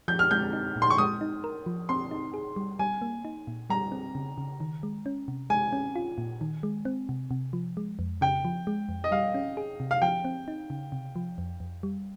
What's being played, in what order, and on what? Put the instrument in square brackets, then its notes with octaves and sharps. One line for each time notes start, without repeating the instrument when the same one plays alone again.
[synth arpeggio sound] F3 [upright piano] G6
[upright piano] F6
[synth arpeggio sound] G#3 [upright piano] G6
[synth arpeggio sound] D#4
A#2
[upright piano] C6
C#6
[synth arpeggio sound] G#3 [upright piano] D#6
[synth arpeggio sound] D#4
A#4
F3
[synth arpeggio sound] C4 [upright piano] C6
[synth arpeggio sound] D#4
G#4
G3
[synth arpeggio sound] G3 [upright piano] G#5
[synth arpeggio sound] A#3
D#4
A#2
[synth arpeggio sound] G3 [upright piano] A#5
[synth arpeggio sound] C4
C#3
C#3
D#3
G#3
C#4
C3
[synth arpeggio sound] G#3 [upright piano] G#5
[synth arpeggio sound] C#4
F4
A#2
D#3
G#3
C4
C3
C3
F3
G#3
F2
[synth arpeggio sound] C#3 [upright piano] G5
[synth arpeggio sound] F3
G#3
F2
[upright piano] D#5
[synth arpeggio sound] G3 [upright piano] F5
[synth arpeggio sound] C#4
G#4
C3
[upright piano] F5
[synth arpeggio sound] F3 [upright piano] G5
[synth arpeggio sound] C4
D#4
C#3
C3
F3
F2
F2
G3